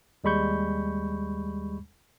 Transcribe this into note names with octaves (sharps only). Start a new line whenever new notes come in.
D#2 G3 G#3 B5 C#6 G6